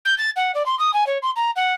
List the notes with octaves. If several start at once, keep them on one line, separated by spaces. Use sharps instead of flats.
G6
A6
F#5
D5
C6
D#6
G#5
C#5
C6
A#5
F#5